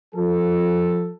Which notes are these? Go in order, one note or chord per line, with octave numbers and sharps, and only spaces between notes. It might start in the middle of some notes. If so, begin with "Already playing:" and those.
F3 A4